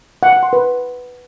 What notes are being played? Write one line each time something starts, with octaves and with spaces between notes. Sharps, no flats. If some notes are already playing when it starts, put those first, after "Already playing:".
F#5
F#5
C6
B4